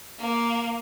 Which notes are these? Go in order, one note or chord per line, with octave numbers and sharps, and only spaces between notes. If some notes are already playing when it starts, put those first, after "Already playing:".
A#3